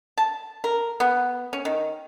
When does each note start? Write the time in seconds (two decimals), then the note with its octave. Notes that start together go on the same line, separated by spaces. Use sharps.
0.18 A5
0.64 A#4
1.00 B3
1.53 C#4
1.65 D#3